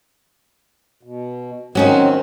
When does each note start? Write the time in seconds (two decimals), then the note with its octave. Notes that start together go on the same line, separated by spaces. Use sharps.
1.03 B2
1.75 D#3 F#3 C4 C#4 D#4